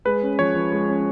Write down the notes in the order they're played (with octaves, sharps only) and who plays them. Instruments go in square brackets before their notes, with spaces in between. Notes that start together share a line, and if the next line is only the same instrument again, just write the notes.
[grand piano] G#3 [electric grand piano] B4
[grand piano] C#4
[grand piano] F3 [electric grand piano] C#5
[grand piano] F3
G#3
C#4